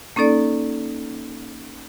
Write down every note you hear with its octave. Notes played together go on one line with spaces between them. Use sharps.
A#3 C#4 D#4 A4 D5